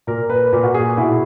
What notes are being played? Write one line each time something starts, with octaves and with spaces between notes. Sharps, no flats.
A#2 A#4
B4
A#2 A#4
F#4
G#4
B2 E4